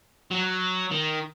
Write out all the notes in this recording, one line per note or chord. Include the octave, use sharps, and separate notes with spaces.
F#3
D#3